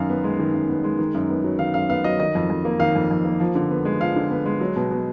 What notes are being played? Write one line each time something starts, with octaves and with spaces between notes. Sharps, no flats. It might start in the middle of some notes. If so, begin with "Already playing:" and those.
Already playing: F#2 D#3 F5
B3
G#3
D#3
F#2
B3
G#3
D#3
F#2
B3
F#3
D#3 F5
F#2 F5
B3 F5
F#3 D#5
D#3 D#5
F2
F2
A#3
D#3 F5
F2
F2
A#3
F3
D3
B3
G#3
F3 F5
D3
B3
G#3
F#3
B2
B2